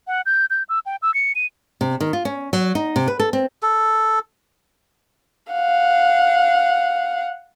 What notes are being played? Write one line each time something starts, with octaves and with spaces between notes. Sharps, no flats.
F#5
G6
G6
E6
G5
E6
C#7
D#7
C3
D#3
F4
C#4
F#3
D#4
C3
B4
A4
C4
A4
F5 F#5